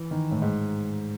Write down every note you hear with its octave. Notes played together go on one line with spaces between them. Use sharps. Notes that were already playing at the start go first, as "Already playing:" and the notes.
Already playing: E3
D#3
A2
G#2